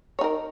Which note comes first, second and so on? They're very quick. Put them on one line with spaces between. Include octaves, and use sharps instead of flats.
C#5 D#4 A#4